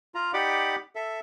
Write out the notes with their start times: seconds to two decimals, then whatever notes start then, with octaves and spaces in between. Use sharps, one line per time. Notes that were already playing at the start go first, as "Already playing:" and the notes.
0.15 F4 A#5
0.34 D#4 G4 D5 F#5 B5 D6
0.95 A4 E5